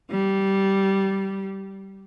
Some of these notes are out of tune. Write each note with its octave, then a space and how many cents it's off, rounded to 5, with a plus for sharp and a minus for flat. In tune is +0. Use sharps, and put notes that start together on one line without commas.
G3 -15